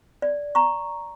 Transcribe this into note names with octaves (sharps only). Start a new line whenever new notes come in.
D5
A#5 C#6